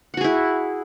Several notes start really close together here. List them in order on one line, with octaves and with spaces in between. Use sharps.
F#5 F#4 G#4 E4